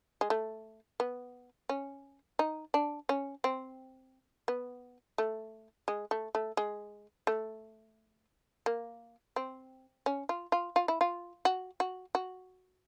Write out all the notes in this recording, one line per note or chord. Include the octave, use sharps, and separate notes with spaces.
G#3
A3
B3
C#4
D#4
D4
C#4
C4
B3
A3
G#3
A3
A3
G#3
A3
A#3
C4
C#4
F4
F4
F4
E4
F4
F#4
F#4
F#4